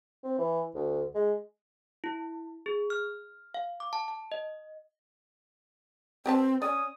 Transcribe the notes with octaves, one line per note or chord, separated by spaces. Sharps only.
C4
E3
D2
G#3
E4
G#4
F6
F5
D6
A5
A5
D#5
C4 G4 B4 A5
C#4 D5 D#6